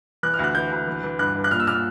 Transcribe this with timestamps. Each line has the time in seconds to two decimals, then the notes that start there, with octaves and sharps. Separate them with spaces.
0.23 E3 F#6
0.34 F6
0.39 D2
0.44 F#6
0.55 E3 G6
0.71 D2
0.87 E3
1.04 E3
1.19 G2 F#6
1.35 G2
1.44 F#6
1.51 A#2 F6
1.60 E6
1.67 A#2 F6